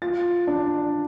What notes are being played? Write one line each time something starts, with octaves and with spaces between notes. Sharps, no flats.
F4 A6
D4